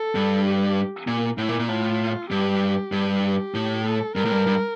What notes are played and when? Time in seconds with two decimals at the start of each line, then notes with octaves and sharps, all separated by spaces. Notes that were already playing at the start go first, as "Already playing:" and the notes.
Already playing: A4
0.15 G2
0.45 G4
1.07 A#2
1.38 A2 E4
1.48 A#2
1.59 A#2
1.69 A2 F4
2.31 G2 G4
2.92 G2
3.23 G4
3.54 A2
3.85 A4
4.16 G2 A#4
4.25 A2
4.31 G2
4.47 G2